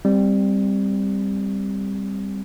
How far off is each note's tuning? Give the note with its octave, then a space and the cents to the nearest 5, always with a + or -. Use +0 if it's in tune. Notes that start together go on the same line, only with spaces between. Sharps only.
G3 +10 C4 +0